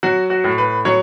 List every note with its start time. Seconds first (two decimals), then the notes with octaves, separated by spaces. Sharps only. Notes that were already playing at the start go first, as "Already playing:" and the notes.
0.03 F#3 F#4
0.30 F#4
0.44 A2
0.58 B4
0.85 F#3 C#5